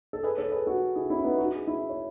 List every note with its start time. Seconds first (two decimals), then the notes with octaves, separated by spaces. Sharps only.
0.13 A4
0.23 G#4 B4
0.37 A4 C#5
0.52 G#4 B4
0.66 F#4 A4
0.95 E4 G#4
1.10 C#4 E4
1.24 B3 D#4
1.38 D#4 F#4
1.53 E4 G#4
1.67 E4 G#4
1.89 C#5